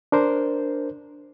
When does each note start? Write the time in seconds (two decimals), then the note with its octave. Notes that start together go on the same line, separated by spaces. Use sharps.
0.12 D4 A#4 C5